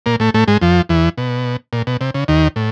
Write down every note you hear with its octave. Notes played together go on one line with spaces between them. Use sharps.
A#2 A#3
A2 A3
A2 A3
G#2 G#3
F2 F3
E2 E3
B2
A#2
B2
C3
C#3
D#2 D#3
A2